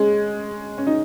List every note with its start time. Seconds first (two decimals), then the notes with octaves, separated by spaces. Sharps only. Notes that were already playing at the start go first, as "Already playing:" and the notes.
Already playing: G#3 C#4
0.78 C#4
0.87 D#4